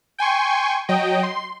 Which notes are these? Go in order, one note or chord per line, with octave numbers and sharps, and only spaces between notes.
G5 G#5 C6 C#6
F#3 D#5 G5
C6